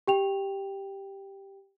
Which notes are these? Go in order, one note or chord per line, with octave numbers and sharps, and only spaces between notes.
G4 G5 F7